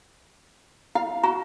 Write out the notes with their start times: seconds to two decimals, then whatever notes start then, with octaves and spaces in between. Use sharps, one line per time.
0.95 E4 F5
1.23 F#4 A#5